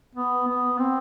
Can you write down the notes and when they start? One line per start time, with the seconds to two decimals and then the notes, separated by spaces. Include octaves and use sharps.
0.15 B3
0.48 B3
0.79 C4